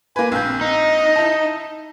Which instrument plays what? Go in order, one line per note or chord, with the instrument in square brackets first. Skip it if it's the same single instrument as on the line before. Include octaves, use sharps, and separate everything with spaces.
[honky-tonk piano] A#3 B4 [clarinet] G#5
[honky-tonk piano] A#1 G6 [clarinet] C4
[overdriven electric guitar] D#4 [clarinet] D#5
[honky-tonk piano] E4 A5